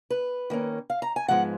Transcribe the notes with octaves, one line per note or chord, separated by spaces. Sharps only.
B4
D#3 A#3 C#4
F5
A#5
G#5
G#2 F3 G#3 B3 F#5